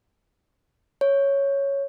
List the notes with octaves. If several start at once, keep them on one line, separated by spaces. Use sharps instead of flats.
C#5